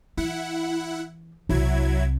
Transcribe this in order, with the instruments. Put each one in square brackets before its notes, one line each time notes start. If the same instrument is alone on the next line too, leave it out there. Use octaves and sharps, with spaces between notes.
[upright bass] E3 [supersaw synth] E4 F#5
[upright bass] C2 C3 [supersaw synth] F#3 E4 G#6